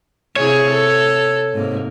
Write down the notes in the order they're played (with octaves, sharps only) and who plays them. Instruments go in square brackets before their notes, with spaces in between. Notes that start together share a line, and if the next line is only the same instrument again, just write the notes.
[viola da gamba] C3 E4 G#4 [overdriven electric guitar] C#5
[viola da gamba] A4
G#2 C3 A#3